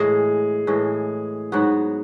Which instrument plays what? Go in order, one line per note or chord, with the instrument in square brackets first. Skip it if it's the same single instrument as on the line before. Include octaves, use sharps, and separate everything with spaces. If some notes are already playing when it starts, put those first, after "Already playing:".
Already playing: [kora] A2 E3 G#3 [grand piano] G#4
[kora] A2 E3 G#3
G#2 F#3 B3 F#4